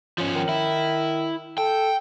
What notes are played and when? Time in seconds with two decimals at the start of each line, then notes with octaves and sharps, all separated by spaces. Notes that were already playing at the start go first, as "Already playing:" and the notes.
0.18 F3 C#4
0.34 D#3
0.49 E4
1.58 A4 G5